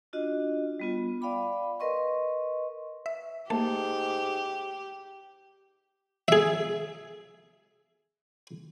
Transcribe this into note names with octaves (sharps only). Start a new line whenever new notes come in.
D4 F4 F#4 D#5
G3 B3 F4
D5 F5 G5 B5 D6
A#4 B4 D#5 C6 C#6
E5
G#2 A3 A#3 G4 A5
G#4 E5